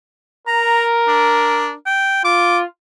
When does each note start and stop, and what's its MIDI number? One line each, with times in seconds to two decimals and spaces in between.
0.48 1.74 70
0.48 0.87 82
1.08 1.73 62
1.86 2.23 79
2.25 2.65 65
2.25 2.58 86